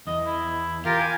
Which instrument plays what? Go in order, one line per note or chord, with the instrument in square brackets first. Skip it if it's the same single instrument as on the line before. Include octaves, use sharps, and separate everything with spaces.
[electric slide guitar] E2 [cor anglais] D#5
[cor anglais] E4
[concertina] F4 A#4 [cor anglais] G4 [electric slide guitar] F5
[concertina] G#5